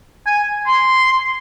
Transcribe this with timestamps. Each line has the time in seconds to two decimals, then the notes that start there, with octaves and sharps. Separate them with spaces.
0.26 G#5
0.67 C6